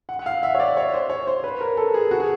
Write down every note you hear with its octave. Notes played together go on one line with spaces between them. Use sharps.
F#5
F#5
F5
E5
C#5
D5
C#5
C5
C#5
C5
B4
A#4
A4
G#4
F#4
G#4